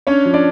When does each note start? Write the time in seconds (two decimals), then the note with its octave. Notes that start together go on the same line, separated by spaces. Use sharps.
0.07 C#4 D4 C#5
0.25 F3
0.34 D4 D5